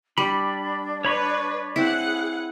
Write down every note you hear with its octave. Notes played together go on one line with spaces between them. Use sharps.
G3 D4 B5
B4 C#5 B5 C#6
C4 E4 G#4 F#5